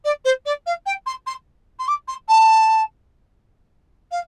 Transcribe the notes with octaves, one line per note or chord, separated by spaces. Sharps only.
D5
C5
D5
F5
G5
C6
C6
C6
D6
C6
A5
F5